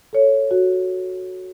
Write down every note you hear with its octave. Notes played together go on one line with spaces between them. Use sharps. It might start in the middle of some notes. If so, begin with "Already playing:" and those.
A4 C#5
F#4